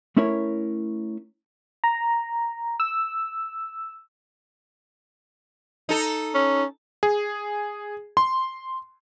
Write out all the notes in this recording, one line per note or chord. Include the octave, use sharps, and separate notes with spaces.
A3 C#4 E4 A#4 C#5
A#5
E6
D#4 A4
C#4
G#4
C6